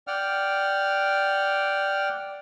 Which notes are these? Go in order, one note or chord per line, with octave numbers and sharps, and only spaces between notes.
D5 F#5 G5 F6